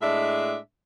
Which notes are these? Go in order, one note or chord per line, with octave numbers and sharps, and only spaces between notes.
A2 G#3 D4 E5